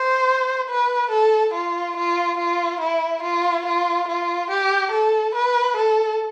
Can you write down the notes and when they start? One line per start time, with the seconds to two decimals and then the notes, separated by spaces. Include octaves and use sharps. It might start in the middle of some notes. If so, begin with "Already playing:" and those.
Already playing: C5
0.69 B4
1.11 A4
1.53 F4
1.97 F4
2.38 F4
2.81 E4
3.22 F4
3.66 F4
4.08 F4
4.50 G4
4.92 A4
5.35 B4
5.76 A4